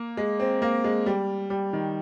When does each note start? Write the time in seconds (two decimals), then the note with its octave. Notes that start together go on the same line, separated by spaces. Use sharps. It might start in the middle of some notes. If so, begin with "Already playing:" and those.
Already playing: A#3
0.17 G#3
0.40 C4
0.62 A#3
0.84 G#3
1.06 G3
1.50 G3
1.73 D#3